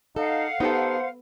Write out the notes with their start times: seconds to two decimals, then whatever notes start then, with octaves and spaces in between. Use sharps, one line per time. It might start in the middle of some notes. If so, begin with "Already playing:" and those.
0.16 D#4 A4 F5 F#5
0.60 B3 D#4 G4 A4 C5